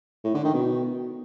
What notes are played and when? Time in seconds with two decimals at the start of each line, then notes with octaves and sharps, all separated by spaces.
0.24 A2
0.34 D3
0.44 D#3
0.54 B2